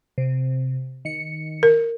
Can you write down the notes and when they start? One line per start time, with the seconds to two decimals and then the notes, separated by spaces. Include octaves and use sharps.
0.18 C3
1.05 D#3 C#7
1.63 A#4